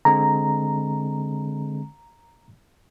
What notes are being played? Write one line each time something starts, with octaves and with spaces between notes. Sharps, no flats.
D3 G#3 C4 A#5